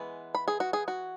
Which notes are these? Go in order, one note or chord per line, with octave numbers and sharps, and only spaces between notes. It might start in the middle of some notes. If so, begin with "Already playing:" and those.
Already playing: E3 G#3 B3
B5
G#4
F#4
G#4
F#4